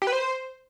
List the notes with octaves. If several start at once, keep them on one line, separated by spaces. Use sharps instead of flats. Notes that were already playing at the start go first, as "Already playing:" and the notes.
G4
B4
C5